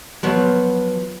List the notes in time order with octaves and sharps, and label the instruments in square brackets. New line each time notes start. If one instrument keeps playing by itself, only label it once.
[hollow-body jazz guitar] F3 F#3 B3